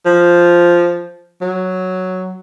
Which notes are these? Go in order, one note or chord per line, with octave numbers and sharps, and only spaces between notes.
F3
F#3